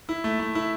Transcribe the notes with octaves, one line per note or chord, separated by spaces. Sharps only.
E4
A3
A3
E4